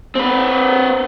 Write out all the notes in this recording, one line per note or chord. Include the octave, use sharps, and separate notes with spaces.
C4 B4